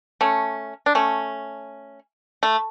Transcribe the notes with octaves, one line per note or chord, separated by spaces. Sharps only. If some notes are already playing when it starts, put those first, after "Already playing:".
A3 C#4
D4
A3 C#4
A3